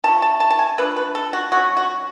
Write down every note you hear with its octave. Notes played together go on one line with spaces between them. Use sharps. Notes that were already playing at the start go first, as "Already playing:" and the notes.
F3 A3 C#4 A5
A5
A5
A5
G#5
F3 A3 D4 B4
B4
A4
F#4
F#3 F#4
C#4
F#4